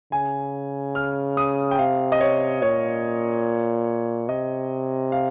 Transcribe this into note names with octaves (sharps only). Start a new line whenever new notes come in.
C#3 G#5
F6
D#6
G5
C3 F5
D#5
C#5
A#2 C#5
C3 D#5
F5